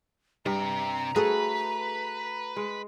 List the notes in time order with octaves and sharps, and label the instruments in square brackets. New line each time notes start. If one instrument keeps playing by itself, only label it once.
[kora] G2 [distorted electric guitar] C3 G5 [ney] A#5
[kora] A3 F#4 A4 [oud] G#4 [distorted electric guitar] B4
[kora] G#3